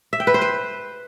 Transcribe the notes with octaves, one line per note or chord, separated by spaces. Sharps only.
E5
G5
B4
C5
B4